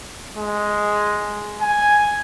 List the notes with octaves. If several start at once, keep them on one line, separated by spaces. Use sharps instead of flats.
G#3
G#5